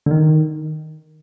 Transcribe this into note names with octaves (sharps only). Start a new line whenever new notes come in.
D3
D#3